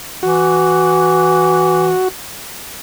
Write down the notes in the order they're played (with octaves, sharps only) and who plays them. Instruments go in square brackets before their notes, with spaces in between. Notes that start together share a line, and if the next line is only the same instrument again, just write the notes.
[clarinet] E3 [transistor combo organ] F#4